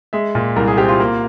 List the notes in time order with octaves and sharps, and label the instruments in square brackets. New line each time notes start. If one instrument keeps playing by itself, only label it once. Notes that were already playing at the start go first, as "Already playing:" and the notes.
[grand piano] G#3 E5
A#2
C2 A#4
G#4
C4 G4
F4
A#3